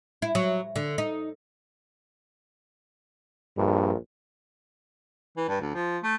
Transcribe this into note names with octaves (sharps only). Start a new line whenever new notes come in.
E4
F#3
D3
D#4
A#1 G2
E3
G2
D2
F3
A3